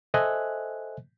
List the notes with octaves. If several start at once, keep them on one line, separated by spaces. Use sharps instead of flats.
A4 C5 D#5 E5 G#5 F#6